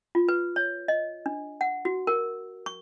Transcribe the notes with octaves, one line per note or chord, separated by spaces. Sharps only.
F4
B4
C#5
D#5
D4
F#5
F#4
A#4
C#6